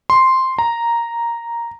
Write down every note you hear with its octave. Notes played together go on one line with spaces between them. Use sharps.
C6
A#5